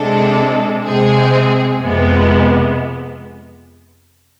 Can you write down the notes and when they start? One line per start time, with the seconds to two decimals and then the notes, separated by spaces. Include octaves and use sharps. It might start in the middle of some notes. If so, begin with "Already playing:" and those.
Already playing: C3 G#3 D4 A4
0.84 C3 G#3 C4 G#4
1.80 F2 C3 G#3 B3